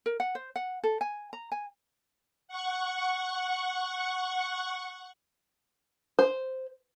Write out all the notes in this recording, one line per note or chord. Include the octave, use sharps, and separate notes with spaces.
A#4
F#5
C5
F#5
A4
G#5
A#5
G#5
F#5 C#6
C5